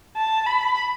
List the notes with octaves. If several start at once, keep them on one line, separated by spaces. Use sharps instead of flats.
A5
B5